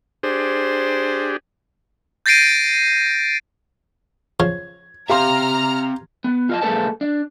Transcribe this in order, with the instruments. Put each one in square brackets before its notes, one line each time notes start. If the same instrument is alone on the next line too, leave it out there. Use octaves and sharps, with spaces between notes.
[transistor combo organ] D4 G4 G#4 [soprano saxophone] C5
[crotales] G6 A6 A#6 C7 D7 D#7
[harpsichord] C#3 F3 [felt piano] G#6
[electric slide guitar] C4 E5 [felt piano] G4 F5 C6 [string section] A#5 F6
[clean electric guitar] B3
F4 D#5 A5
B1 G#3 A#3 A4 B4 A5
D4